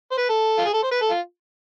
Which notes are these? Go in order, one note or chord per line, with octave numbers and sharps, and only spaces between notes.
C5
B4
A4
F4
G#4
A4
C5
B4
A4
F4